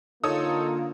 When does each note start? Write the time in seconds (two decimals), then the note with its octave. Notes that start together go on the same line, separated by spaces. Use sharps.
0.24 D3 A#3 D#4 F4 A4 C#5 D#6